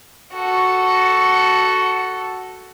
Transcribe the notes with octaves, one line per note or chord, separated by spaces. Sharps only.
F#4 A4